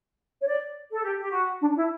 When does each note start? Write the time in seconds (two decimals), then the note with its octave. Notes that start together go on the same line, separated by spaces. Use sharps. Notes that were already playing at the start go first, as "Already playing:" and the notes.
0.41 C#5
0.47 D5
0.92 A4
1.03 G4
1.20 G4
1.31 F#4
1.61 D4
1.76 E4